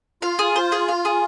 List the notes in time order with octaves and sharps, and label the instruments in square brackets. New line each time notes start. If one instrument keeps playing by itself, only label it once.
[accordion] F4 [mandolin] F5
[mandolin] G#4
C5
G#4
F5
G#4